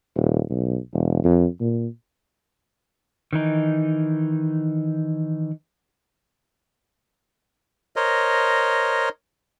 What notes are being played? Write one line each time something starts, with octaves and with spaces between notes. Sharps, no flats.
D#1
B1
E1
F2
A#2
D#3 E3 D#4
A#4 C5 C#5 D#5